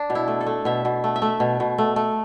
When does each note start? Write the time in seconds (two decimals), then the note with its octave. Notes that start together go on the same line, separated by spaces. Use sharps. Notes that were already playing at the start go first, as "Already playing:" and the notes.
Already playing: D4
0.10 B2
0.15 E4
0.28 A3
0.41 A4
0.46 A3
0.65 B2 E5
0.85 B2
1.04 A3
1.16 E5
1.22 A3
1.40 B2
1.60 B2
1.78 A3
1.96 A3